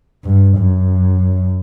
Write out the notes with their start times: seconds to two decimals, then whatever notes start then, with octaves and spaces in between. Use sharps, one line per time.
0.24 G2
0.57 F#2